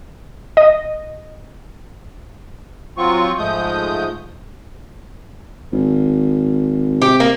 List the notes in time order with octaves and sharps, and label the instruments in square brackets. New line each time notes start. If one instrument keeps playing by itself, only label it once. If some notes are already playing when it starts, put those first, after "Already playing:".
[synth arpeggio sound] D#5
[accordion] F#3 C4 F4 C#6
G#2 F3 G#3 A3 D#6 G6
[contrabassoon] G#1
[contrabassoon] C3 [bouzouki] G4
[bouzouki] A#3